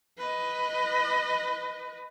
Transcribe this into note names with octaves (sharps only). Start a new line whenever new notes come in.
B4 D#5